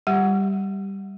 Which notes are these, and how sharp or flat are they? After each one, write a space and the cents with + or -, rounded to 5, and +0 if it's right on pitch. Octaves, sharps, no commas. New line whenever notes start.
G3 +0 G4 +0 F#5 +0